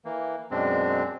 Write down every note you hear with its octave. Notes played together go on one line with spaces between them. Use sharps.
E3 A#3
F#2 B2 G#3 C4 D4